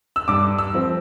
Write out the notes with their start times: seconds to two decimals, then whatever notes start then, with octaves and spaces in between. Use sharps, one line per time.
0.16 E6
0.28 G2 D6
0.58 E6
0.74 F3 C4